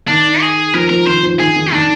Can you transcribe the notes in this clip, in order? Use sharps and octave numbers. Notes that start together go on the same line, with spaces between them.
D#3 D4
G#4
F3 A#4
F3 A#4
D#3 C5
F3
D#3 G#4
D#3
D#3 D4